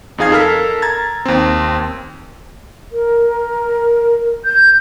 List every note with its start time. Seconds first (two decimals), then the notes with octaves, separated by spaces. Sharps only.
0.18 F2 D#4 G#4 F5 G#6 C7
0.32 A4 A#4 F6 B6
0.82 A#5 G#6 A6
1.26 D#2 C4
2.91 A#4
4.45 G6